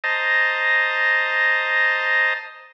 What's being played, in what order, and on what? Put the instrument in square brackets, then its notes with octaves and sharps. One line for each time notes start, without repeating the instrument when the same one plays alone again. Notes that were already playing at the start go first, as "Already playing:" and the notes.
[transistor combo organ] C5 D#5 A5 A#5